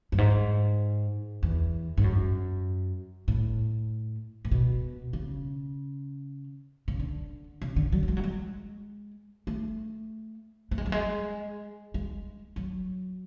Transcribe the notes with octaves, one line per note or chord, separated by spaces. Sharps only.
F#2
G#2
E2
G#2
F#2
A2
A2
B2
C#3
C#3
D3
C#3
D3
F#3
F#3
G#3
F#3
G#3
A3
A3
G#3
F#3
G#3
G#3
F#3